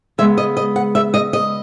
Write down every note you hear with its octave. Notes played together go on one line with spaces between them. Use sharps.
C#3 G#3 B3 E5
D#5
D#5
F#5
E5
D#5
D#5